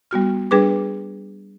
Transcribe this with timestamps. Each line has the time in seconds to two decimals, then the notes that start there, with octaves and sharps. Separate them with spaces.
0.11 G3 B3 F#4 F6
0.51 G3 D4 G#4 B4 D6